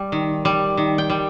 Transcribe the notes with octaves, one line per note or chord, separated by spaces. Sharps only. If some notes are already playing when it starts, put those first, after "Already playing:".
Already playing: G3
D#3
G3
D#3
G5
G3